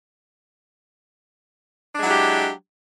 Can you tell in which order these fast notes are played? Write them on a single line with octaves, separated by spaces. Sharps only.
D4 G#3 F#3 E4 G4